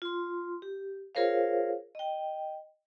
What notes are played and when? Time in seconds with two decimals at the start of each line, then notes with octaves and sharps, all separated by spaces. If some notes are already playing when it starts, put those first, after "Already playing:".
0.02 F4 C6
0.62 G4
1.15 F4 G#4 A#4 C5 C#5 F5
1.95 D#5 G5